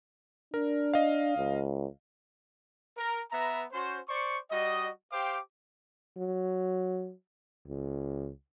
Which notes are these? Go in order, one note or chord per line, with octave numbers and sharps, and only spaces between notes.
D4 A#4
D#5 F5
C#2
A#4
B3 B4 E5 A#5
C#4 F#4 C5
C5 D5 C#6
G3 F#4 D#5
G4 C5 F5 G5 D6
F#3
C#2